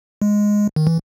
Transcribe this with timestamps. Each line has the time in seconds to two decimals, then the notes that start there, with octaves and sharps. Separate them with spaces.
0.22 G#3
0.76 D#3
0.87 E3